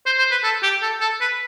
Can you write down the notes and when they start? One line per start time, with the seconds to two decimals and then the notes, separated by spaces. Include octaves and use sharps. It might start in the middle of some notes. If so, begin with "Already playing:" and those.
0.06 C5
0.18 C5
0.31 B4
0.44 A4
0.63 G4
0.82 A4
1.01 A4
1.21 B4